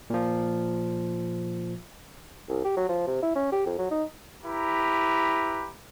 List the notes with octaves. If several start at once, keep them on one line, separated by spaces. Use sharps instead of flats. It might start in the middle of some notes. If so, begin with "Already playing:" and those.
A#2 F3
C2
G4
F#3
F3
C3
E4
C#4
G4
F2
F#3
D#4
E4 G4 B4 A#5